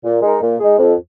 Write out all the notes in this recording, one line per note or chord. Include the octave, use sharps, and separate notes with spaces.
A#2
G#3 D#4 A#4
A#2
G#3 D#4 G#4
F2